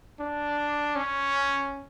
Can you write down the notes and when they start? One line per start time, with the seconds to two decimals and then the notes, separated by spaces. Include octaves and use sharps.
0.20 D4
0.95 C#4